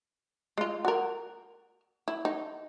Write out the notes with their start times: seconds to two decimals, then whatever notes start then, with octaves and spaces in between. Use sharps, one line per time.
0.58 G#3 F4
0.85 F#4 A#4
2.08 E4
2.25 D#4